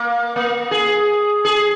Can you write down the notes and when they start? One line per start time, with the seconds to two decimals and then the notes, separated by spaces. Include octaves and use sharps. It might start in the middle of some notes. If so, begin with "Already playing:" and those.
Already playing: A#3
0.36 A#3
0.71 G#4
1.45 G#4